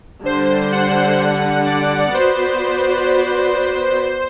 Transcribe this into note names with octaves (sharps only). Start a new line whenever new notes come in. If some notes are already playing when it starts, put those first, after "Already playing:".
D3 G3 D4 C5
F#5
D5
B3 F#4 B4 C5 D5